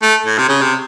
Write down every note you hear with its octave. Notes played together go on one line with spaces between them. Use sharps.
A3
A2
C3
C#3
C3